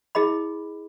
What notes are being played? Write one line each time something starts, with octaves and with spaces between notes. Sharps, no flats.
E4 G#4 D#5 B5